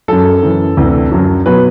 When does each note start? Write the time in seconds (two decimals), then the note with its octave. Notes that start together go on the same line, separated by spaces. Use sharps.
0.08 F#2 F#3 A4
0.43 F#2 E3
0.77 D2 C3 E3
1.12 F#2 F#3
1.46 B2 F#3 B4